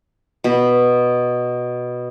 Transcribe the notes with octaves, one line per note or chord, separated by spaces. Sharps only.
B2 B5